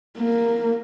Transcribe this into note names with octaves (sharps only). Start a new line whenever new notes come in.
A#3